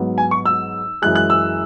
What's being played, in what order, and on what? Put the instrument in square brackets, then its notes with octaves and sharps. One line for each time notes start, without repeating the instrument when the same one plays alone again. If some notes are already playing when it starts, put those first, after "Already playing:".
Already playing: [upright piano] G#2 F#3 B3
G#5
C#6
E6
F#2 E3 G#3 F#6
F#6
E6